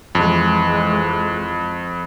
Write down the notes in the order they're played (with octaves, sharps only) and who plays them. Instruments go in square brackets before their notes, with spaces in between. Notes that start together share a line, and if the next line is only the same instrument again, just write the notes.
[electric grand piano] F2 [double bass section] E3 G#3